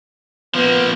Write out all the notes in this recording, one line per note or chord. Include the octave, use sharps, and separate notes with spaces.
F3 A#3 B3